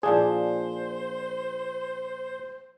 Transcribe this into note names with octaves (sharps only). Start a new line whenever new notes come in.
A#2 F3 D4 G#4 C5